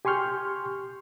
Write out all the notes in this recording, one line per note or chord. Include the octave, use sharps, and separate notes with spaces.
G4 G#5 C6 C#6 F6 G6